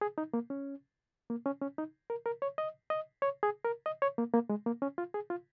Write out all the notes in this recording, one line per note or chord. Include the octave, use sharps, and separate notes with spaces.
G#4
D#4
A#3
C#4
A#3
C#4
C#4
D#4
A#4
A#4
C#5
D#5
D#5
C#5
G#4
A#4
D#5
C#5
A#3
A#3
G#3
A#3
C#4
F4
G#4
F4